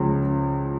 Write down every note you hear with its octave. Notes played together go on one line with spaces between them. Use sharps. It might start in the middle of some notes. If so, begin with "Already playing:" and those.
Already playing: C#2 C#3 F3